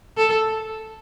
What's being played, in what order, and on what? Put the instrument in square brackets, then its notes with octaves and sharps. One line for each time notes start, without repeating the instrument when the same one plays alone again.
[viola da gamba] A4